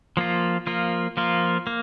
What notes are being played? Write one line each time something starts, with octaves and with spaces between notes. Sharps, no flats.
F3 A#3 F4
F3 A#3 F4
F3 A#3 F4
A#3